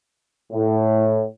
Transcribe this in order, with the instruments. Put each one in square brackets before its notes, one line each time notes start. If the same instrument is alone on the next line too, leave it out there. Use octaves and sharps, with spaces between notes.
[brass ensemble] A2